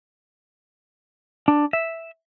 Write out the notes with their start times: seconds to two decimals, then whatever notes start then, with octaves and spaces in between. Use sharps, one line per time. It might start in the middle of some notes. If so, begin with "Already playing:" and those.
1.48 D4
1.73 E5